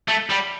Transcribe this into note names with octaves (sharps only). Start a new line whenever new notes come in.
A3
G3